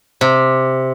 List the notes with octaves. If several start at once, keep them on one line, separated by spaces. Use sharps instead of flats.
C3